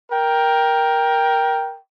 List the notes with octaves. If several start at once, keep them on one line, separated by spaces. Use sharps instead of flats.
A#4 G5